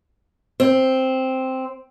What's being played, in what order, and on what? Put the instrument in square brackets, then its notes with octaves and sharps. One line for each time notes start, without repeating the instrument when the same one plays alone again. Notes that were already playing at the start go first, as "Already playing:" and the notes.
[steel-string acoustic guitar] C4